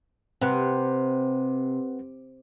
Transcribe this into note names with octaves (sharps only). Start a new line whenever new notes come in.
C3 C4 B4 F#5